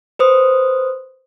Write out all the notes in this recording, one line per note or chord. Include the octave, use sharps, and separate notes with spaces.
B4 C5 D#6